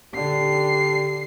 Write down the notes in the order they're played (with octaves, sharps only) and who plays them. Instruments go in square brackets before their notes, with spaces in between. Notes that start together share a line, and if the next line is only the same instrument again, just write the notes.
[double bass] D3 [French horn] G4 [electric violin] C7